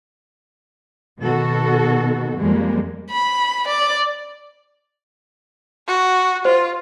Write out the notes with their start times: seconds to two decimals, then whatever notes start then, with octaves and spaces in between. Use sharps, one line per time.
1.20 B2 D#3 F#4 A4
2.38 F2 G3 G#3 A#3
3.10 B5
3.68 D5
5.87 F#4
6.45 F4 C5